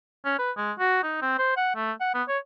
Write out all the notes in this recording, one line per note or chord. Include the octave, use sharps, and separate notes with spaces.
C#4
B4
G#3
F#4
D#4
C4
C5
F#5
A3
F#5
B3
C#5